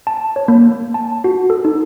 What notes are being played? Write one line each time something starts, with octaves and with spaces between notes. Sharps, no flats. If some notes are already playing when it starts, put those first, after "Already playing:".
A5
C#5
A#3
A5
F#4
A4
D#4